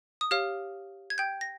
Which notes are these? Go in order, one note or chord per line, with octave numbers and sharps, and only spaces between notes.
D#6
G4 C#5 F5 F6
G#6
G5 G6
A#6